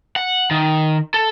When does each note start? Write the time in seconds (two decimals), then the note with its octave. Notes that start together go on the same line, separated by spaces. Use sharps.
0.16 F#5
0.51 D#3
1.14 A4